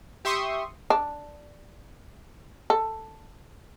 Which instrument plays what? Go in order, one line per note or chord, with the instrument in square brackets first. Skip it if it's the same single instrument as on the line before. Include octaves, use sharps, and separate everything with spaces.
[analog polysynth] G4 E5 C6 C#6 D#6
[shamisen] D4
A4